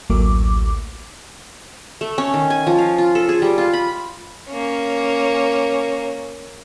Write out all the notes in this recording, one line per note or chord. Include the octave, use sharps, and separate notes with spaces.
A1 D2 F#3 A3 A#3 D6
A3
C#4
D#3
G#5
F3
F5
F4
A4
G#4
G3
F4
B5
A#3 C#4